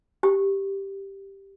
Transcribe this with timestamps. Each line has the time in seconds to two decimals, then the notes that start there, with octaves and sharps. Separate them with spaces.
0.23 G4